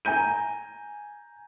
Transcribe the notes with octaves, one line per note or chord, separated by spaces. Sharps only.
G#5 A#5 G6 D#7